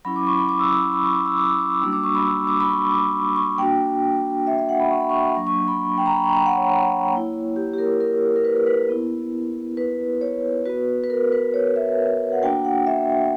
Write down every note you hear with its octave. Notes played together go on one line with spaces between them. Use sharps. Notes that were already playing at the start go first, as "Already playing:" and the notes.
F#3 C#4 E4 B5
D6
C#6
B5
D6
E6
E6
D6
B5
C#6
D6
E6
D6
E6
D6
G3 A#3 D4 F#4 E6
D6
C#6
B5
E6
D6
B5
C#6
D6
C#6
A#3 D4 F#4 G5
E5
E5
F#5
B5
C#6
B5
C#6
F#3 A#3 D4 C#6
C#6
B5
G5
A#5
B5
C#6
G5
F#5
C#5
A#3 E4
G4
G4
A#4
A#4
A#4
B4
A#4
B4
B3 E4
B4
C#5
B3 F#4 B4
B4
A#4
B4
C#5
E5
F#5
A#3 D4 F#4 G5
F#5
E5